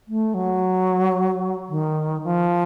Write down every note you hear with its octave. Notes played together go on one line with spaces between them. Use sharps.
A3
F#3
D#3
F3